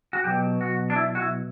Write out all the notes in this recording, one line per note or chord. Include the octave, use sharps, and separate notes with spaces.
F#4
B2 F#3 G4
F#4
D4
E4
F#4
E4